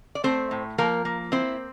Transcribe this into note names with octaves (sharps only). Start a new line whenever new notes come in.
D5
A3 C4 C5
A2
F3 A#3 A#4
A#3
C4 E4 C5